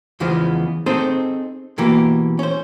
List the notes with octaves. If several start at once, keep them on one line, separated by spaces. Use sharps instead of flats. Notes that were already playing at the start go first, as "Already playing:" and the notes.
E2 C#3 E3 F3 G#3 B3
C4 D#4 G#4 A4 C5
B2 E3 A#3 G4
C#4 C5